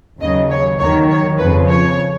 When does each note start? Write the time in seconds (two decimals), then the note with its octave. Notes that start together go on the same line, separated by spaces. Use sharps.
0.20 D#2 C#3 F#3 D#5
0.50 C#5
0.79 D#2 D#3 F#3 C#5
1.10 C#5
1.38 F2 C#3 F3 B4
1.69 C#5